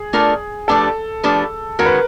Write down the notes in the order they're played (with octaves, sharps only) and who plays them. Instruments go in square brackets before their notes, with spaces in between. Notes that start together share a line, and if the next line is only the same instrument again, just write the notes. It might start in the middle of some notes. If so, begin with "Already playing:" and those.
Already playing: [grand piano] G#4
[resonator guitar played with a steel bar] A3 D4 F4 A#4
[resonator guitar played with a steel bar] F3 A3 D4 G4 B4 [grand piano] A4
[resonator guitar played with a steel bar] F3 A3 D4 G4 B4
[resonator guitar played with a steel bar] D#3 G#3 C#4 F#4 [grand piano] A#4
[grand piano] B4